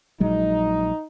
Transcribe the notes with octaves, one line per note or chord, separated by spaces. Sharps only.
A#1 F#3 G#3 D#4